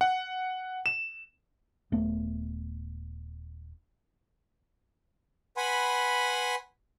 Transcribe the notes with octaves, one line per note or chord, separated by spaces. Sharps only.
F#5
E7
D#1 A3 B3
B4 F#5 G#5 B5 C6